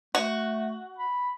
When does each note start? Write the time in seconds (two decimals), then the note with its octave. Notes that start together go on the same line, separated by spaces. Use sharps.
0.15 A3 F#4
0.98 B5